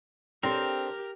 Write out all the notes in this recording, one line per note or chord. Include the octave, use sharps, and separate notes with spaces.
C4 D4 G4 A4 A#4 C5